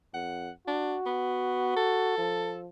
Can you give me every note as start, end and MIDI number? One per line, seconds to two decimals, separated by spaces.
0.14 0.51 41
0.14 0.51 78
0.67 0.96 62
0.67 2.15 66
1.06 1.76 59
1.77 2.60 69
2.18 2.68 53